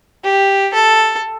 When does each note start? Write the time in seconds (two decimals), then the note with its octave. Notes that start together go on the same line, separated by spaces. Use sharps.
0.24 G4
0.74 A4